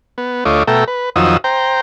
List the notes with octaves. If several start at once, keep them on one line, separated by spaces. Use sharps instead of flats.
B3
D2 A3 F4 C#5 D#5 D6
B2 A3 A4 E5 G5 A#5
B4
F2 D#3 F3 F#3 D#6 E6
C5 G5 A#5